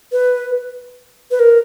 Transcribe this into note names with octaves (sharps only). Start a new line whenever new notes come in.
B4
B4
A#4